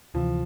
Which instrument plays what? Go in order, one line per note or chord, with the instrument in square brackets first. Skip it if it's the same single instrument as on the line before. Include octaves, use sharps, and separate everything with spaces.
[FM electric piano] D2 C3 E3 [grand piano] F3